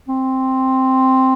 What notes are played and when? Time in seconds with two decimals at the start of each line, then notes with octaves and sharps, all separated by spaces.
0.08 C4